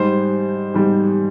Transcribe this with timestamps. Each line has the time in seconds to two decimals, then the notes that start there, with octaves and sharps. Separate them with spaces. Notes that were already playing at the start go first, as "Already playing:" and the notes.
Already playing: G#2 G3 C5
0.74 G#2 G3